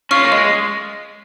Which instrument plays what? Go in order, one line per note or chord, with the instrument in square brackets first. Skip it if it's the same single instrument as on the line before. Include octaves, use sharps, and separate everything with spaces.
[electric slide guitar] C#4 F4 [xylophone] C#6 F6
[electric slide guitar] A#3
[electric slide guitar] G#3 [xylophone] D#5